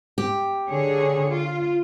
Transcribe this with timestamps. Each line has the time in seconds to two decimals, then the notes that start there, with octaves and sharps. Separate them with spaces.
0.18 G4
0.69 D3 G#4 C#5
1.31 F4